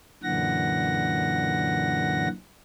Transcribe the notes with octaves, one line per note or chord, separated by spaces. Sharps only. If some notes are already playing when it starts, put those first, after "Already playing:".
F#2 A#2 D3 E3 F#5 A#6